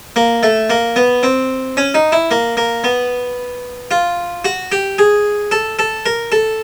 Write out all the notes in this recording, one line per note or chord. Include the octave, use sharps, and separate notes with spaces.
A#3
A3
A#3
B3
C4
C#4
D#4
E4
A#3
A#3
B3
F4
F#4
G4
G#4
A4
A4
A#4
A4